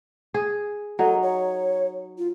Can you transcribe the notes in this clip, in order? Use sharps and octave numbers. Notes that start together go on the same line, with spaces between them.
G#4
F#3 D#4 A4
C#5
F4